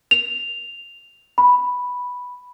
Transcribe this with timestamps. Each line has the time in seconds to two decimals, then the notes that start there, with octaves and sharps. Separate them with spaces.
0.11 F7
1.38 B5